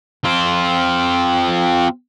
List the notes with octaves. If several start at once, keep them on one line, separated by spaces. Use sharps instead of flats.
C4 F4